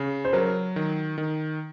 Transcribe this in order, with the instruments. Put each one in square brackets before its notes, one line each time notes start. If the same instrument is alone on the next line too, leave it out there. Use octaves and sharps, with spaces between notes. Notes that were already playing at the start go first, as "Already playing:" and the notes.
Already playing: [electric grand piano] C#3
[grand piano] C5
[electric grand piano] F#3 [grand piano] A#4
[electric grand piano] D#3
D#3